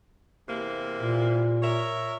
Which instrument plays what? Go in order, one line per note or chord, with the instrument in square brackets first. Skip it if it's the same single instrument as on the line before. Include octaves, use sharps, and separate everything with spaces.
[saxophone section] E2 C3 A#3
[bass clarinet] A#2
[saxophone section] A#4 C#5 E5